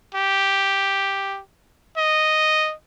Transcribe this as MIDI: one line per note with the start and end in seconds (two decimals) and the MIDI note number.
0.14 1.40 67
1.97 2.73 75